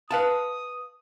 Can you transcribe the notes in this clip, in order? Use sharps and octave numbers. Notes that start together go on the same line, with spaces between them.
B4 F5 A5 D#6